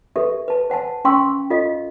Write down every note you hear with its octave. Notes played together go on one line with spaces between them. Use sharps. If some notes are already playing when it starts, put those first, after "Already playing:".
G4 A4 B4 E5
B4 A5
C5 F#5 G#5 A5
C#4 F5 G5 C6 C#6 E6
F4 A4 D#5 F5